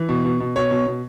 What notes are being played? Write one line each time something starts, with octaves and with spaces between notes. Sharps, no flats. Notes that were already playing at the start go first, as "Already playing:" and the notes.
Already playing: E3
B2
B2
B2
B2 C#5
B2
B2